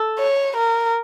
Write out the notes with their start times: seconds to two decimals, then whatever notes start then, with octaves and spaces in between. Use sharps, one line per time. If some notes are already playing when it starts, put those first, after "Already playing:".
Already playing: A4
0.19 C#5
0.56 A#4